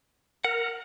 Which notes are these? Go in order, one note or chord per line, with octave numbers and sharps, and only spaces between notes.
A#4 F#5